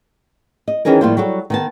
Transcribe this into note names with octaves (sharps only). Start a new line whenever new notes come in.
D#5
D#3 E3 C#4 D#4 G#4 A#4
A2 F3 G3 A#3 F4 C5
F#3 G3 F#4 A4
D#3 B3 A5